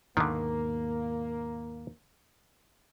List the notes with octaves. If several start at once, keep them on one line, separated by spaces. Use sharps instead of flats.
D#2 G#2 B2 D3 D#3 A#3